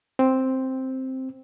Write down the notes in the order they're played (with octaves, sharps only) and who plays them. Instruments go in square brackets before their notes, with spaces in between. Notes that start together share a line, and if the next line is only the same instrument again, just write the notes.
[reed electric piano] C4